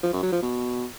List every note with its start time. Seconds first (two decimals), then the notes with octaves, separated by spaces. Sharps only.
0.03 F3
0.13 F#2
0.23 F#3
0.32 F3
0.42 B2